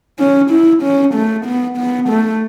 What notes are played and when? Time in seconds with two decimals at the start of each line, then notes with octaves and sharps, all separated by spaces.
0.19 C#4
0.51 E4
0.83 C#4
1.14 A3
1.46 B3
1.78 B3
2.09 A3